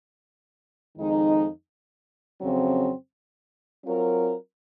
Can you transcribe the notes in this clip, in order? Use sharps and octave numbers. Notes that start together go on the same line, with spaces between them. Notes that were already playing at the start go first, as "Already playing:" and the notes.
F2 D#3 G#3 D#4
F2 C#3 F#3 C4
F#3 C4 F4 A#4